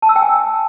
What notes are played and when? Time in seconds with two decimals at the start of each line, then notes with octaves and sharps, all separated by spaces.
0.02 A5
0.09 E6
0.16 G5
0.22 G#5